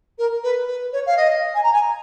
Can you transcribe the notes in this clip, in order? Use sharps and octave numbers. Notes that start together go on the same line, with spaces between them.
A#4
B4
B4
C#5
F5
D#5
G#5
A#5
G#5